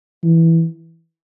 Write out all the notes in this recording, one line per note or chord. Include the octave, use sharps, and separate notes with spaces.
E3